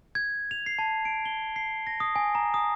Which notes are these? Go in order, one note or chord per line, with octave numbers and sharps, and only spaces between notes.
G#6
F7
C7
A5
D7
G7
C7
A#6
D#6
G#5
A#5
D#6